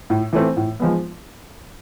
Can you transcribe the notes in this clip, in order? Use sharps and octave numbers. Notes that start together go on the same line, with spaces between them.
A2
E3 A3 C4
A2
F3 G#3 B3